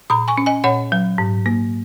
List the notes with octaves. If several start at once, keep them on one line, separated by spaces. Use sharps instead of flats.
A#2 A#5 D#6
G#5 C#6
C#4
D#5 G#5
A#2 C#5 F#5
F#3
G#2
A#3